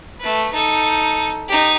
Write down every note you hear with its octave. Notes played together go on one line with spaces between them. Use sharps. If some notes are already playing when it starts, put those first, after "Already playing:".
A3 B4
D#4 A4
D#4 G4